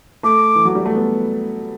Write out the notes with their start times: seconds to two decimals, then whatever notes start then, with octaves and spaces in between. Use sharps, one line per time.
0.23 A3 D6
0.55 E3
0.65 F#3
0.75 G3
0.86 A3
0.95 B3